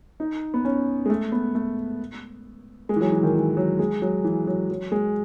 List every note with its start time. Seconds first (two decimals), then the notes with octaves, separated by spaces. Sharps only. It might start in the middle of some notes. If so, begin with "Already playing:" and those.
0.20 D#4
0.54 B3
0.65 C#4
1.06 G#3
1.10 A3
1.32 B3
1.55 A3
2.89 G#3
2.96 E3
3.01 F#3
3.12 E3
3.23 D#3
3.35 E3
3.57 F#3
3.79 G#3
4.02 F#3
4.24 E3
4.47 F#3
4.70 F#3
4.92 G#3